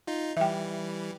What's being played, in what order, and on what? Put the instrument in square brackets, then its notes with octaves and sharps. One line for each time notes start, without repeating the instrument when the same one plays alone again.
[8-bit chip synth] D#4 F4
[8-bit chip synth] E3 G3 [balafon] E5 G5